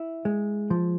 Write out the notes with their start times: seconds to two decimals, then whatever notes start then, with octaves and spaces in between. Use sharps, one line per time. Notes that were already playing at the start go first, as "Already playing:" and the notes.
Already playing: E4
0.25 G#3
0.70 F3